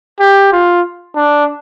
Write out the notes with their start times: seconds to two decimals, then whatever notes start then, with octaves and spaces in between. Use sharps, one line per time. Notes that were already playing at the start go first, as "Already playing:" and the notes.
0.20 G4
0.53 F4
1.16 D4